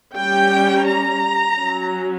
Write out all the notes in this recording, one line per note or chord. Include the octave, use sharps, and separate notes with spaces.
G3 C#4 G5
A#5
F#3 C#4